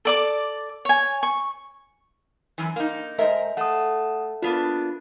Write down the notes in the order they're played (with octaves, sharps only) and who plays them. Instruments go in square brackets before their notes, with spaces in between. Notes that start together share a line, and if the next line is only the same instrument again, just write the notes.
[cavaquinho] A4 D5 D6
C#5 G#5
C#6
[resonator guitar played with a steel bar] F#2 E3
A#3 D#4
[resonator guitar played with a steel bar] G#2 A#4 [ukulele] C5 D#5 E5
[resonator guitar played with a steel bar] A3 [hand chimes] F#5 D#6
[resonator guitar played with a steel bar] A#3 B3 D4 [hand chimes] F4